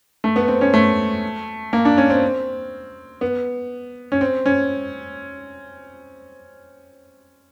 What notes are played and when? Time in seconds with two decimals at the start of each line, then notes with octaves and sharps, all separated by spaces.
0.24 A3
0.36 B3
0.48 C4
0.61 C#4
0.74 A3
1.73 A#3
1.85 D4
1.97 C#4
2.10 C4
3.21 B3
4.12 C#4
4.21 C4
4.46 C#4